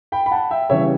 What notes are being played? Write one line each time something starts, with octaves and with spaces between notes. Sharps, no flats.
G5 B5
B5
F#5 A5
E5 G5
C#3 E3 G3 C#5 E5